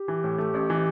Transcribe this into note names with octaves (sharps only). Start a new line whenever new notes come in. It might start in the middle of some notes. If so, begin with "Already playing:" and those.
Already playing: G4
E3
A2
A3
A1
E3